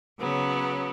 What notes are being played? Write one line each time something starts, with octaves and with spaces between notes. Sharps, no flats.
C#3 F#3 B3